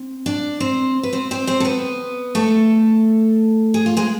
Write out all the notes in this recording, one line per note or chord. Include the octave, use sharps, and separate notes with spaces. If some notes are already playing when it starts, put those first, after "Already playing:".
Already playing: C4
D4 D5
C4 C5
B4
C4 C5
C4 C5
C4 C5
A4
B3 B4
A3 A4
G#4
F4
G#3 G#4